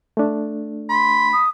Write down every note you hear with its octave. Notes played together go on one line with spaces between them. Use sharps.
A3 D4
B5 C6
D#6